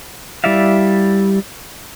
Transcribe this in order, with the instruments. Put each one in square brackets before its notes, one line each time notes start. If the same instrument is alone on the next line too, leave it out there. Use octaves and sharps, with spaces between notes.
[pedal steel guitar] G3 E4 D5 E5 F5